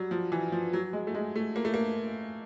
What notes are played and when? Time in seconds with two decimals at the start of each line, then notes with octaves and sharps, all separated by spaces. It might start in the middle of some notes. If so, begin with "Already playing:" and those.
Already playing: F#3 G3
0.11 F3
0.32 E3
0.52 F3
0.73 F#3
0.93 G#3
1.07 A3
1.14 G#3
1.36 A3
1.56 A#3
1.65 A3
1.74 A#3